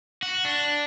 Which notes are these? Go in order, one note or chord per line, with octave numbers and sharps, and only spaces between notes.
F#4
D4